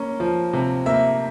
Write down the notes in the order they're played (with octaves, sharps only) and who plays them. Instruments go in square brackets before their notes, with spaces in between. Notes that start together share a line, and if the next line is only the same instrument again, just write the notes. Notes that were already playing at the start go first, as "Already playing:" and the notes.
Already playing: [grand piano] A#3 C#4
F3
C3
A#3 E5